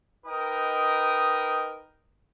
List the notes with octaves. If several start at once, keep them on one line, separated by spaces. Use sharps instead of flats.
D#4 A#4 B4 D#5 G5 D#6